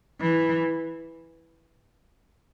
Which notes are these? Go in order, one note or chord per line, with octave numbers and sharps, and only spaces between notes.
E3